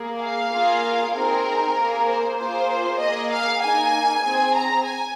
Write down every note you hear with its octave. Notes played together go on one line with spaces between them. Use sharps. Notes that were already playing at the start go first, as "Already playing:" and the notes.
Already playing: A#3 G#4
F5
A#3 F4 G#4
C4 D#4 G#4 A#4
A#3 G#4
C5
A#3 F4 G#4 C5
A#3 G#4 D#5
F5
A#3 D#4 G#4 G#5
C4 G#4
A#5
G#5